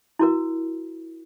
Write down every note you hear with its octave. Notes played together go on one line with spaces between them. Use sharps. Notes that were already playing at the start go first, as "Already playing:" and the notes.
E4 F#4 A#4